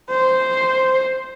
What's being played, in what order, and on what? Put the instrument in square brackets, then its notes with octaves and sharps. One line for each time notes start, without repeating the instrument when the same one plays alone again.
[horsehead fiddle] C5